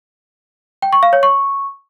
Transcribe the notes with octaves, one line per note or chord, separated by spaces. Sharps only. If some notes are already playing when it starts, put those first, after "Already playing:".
G5
C#6
F5
C#5
C#6